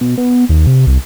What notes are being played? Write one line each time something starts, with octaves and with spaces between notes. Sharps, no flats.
B2
B3
D#2
C3
C2